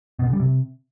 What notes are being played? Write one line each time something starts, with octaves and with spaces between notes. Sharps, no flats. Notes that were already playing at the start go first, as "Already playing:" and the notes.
B2
C#3
G3
C3